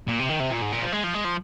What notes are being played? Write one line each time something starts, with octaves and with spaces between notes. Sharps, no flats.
A#2
C3
D#3
C3
A#2
G#2
A#2
F3
G#3
F3
G#3
F3